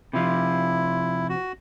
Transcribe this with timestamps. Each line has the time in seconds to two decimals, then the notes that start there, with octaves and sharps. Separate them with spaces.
0.13 C3 F3 E4
1.29 F#4